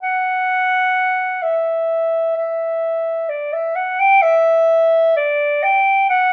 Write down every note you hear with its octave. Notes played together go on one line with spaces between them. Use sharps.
F#5
E5
E5
D5
E5
F#5
G5
E5
D5
G5
F#5